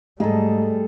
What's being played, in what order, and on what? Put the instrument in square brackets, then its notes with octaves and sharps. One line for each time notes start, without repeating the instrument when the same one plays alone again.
[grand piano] G#2 D#5 A#5 [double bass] G3 A3 [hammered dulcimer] G#4 A4